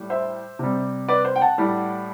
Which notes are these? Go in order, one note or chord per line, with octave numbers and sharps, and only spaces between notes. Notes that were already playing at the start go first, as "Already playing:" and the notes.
Already playing: A2 G3
C5 E5
C3 G3
B4 D5
C5
G5
F#5 A5
A2 G3